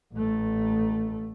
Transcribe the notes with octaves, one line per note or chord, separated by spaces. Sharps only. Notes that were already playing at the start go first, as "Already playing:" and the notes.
A1 A3